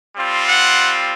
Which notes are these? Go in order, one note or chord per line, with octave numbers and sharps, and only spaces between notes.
G3 C4 F4
F#5